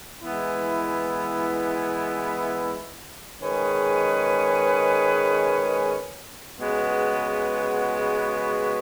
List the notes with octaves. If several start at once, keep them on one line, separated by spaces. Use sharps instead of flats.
E3 G#3 B3 E4
D#3 G#3 C#4 G#4 B4
C#3 G#3 B3 F#4 B4